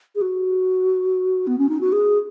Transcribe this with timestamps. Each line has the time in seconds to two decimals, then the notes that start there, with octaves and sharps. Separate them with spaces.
0.15 G#4
0.21 F#4
1.47 B3
1.58 C#4
1.69 D#4
1.81 F#4
1.92 G#4